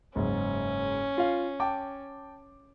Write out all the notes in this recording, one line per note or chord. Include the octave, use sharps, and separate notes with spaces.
F#1 G#2 C#4
F4 F5
G5 A5 D6